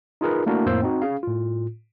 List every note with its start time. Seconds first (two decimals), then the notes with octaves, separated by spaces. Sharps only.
0.21 D#4 F4 G#4 A#4 B4
0.46 A3 A#3 D4 E4 F#4 A#4
0.66 F2 A2 A#3 C5 E6
0.82 C4 D#4 F#4
1.02 C#4 G#4 F5
1.23 A2 F4